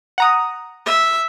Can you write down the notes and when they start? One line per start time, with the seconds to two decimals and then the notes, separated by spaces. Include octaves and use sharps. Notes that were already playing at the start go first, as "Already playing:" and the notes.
0.18 F#5 A#5 D#6
0.86 E5